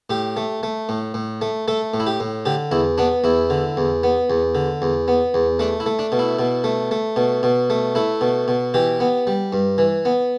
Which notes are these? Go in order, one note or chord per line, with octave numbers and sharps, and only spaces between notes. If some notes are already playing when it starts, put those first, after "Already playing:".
A2 G4
A3
A3
A2
A2
A3
A3 A4
A2
E4
G4
A2
D3 G4
E2 E4
B3 D4
E2 E4
D3
E2
B3
E2
D3
E2
B3
E2
A3 D4
E4
A3
D4
B2
E4
B2
A3
A3
B2
B2
A3
A3 E4
B2
B2
E3 G4
B3
G3
G2
E3
B3